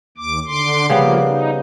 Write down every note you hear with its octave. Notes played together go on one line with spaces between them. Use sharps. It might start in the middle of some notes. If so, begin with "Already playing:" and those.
D#2 D6
D3 C6 D6
C#3 F3 G3 A#3 B3
D#4